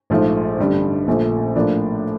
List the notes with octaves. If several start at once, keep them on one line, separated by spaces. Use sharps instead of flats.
A#1 G#2 F3 A3
A1 G2 D3 G3
A#1 A#2 F3 A3
A2 F3 A#3 D4